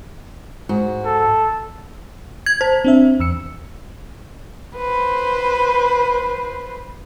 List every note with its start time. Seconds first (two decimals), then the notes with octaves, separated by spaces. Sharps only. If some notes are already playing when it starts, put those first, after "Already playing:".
0.69 G#2 F#4
1.06 A4
2.46 G#6
2.61 C5 A5
2.85 C4 D4 E5
3.20 E2 E6 C#7
4.76 B4 C5